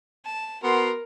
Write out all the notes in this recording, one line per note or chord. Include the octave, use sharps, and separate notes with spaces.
A5
B3 F#4 A#4 C6